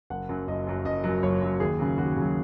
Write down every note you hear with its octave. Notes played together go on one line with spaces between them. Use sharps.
F#1 F#5
F#2 F#3
F#1 D#5
F#2 F#3
F#1 D#5
F#2 F#3
F#1 C#5
F#2 F#3
D#2 G#4
C#3 F#3
D#2 F#4
C#3 F#3